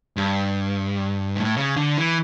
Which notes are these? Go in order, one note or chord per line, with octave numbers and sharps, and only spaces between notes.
G2
A2
C#3
D3
E3